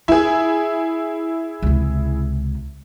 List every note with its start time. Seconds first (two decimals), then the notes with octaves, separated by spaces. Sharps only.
0.08 E4 F4 G#4
1.62 C#2 C3